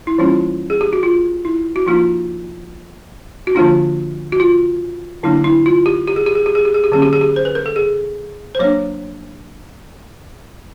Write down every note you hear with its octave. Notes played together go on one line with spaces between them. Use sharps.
E4
E3 G3 A#3 C#4 E4 F4
G#4
G4
F#4
F4
E4
F#4
F3 A#3 D#4 F4
F#4
D3 F3 A#3 D4 F4
F#4
F4
D3 F#3 A#3 D4 E4
E4
F4
G4
G4
G#4
G4
G#4
G4
G#4
G4
G#4
G4
D3 F#3 A#3 C#4 G#4
G4
G#4
G4
C5
B4
A#4
A4
G#4
C5
F#3 A#3 D4 C#5